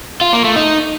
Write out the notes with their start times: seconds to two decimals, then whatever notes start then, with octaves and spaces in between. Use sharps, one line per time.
0.21 F4
0.33 A#3
0.44 A3
0.56 D#4